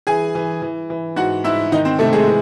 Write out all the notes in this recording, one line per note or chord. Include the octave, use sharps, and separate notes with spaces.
E3 G#4 G#5
E3
E3
E3
G#2 F#4 F#5
G#2 E4 E5
D#3 D#4 D#5
C4 C5
C3 A3 A4
G#3 G#4
E3